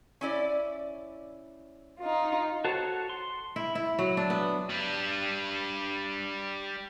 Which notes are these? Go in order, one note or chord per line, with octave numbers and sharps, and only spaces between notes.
C#4 E4 D5
D#4 F4
F#4 A4 C5 C#5
C6
E4
E4
F#3
D4
B3
G3 D4